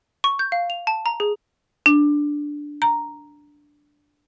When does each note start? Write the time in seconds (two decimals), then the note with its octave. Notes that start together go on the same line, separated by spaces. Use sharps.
0.24 C#6
0.39 G6
0.52 F5
0.70 F7
0.87 A5
1.06 A#5
1.20 G#4
1.86 D4
2.82 A#5